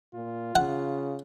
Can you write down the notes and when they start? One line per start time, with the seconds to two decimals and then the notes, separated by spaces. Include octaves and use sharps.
0.14 A#2 F4
0.56 C#3 F#5